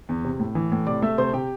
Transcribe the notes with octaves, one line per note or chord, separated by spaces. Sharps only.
E2
C3
A2
E3
A2
C3 D5 D6
A3 E5 E6
C3 C5 C6
C3 G4 G5